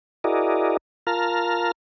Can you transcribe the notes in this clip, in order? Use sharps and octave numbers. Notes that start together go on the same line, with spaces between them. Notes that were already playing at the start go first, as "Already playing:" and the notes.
E4 F#4 G#4 A#4 D5 D#5
F4 A#4 A5 A#5 F6